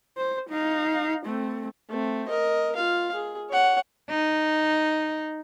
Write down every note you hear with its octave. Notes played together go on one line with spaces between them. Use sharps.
C5
D#4 F5
A3 C4
A3 C4
A#4 D#5
F4 F5
G#4
C#5 F#5
D#4